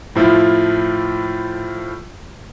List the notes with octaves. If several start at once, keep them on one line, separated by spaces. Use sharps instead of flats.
A2 F3 E4 F4